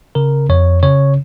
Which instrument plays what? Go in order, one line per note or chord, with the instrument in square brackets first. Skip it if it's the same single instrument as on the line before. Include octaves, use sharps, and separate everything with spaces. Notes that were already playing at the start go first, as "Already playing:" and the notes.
[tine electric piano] C#3 A#4
F2 C#5
C#3 C#5